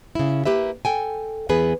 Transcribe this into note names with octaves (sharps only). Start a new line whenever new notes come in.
C#3 E4
A#3 G4 B4 E5
A4 G5 G#5
E2 E3 B3 G#4 B4